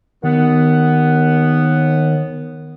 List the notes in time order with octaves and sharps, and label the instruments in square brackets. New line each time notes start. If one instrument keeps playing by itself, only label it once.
[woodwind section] D#2 B3 F#5 [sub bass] D#3